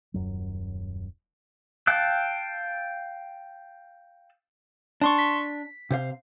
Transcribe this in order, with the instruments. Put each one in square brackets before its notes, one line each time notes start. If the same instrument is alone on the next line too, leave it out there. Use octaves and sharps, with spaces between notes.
[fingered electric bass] D#1 F#2 F#3
[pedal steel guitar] F5 G5 A5 E6 F#6
[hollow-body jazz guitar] D4 [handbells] A5 C6 C#6
[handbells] B6
[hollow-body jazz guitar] C3 C5 F5